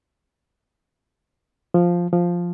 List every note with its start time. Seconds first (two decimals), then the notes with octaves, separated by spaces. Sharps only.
1.74 F3
2.13 F3